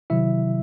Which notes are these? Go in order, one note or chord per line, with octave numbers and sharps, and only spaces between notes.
C3 D#3 F#3 E4 E5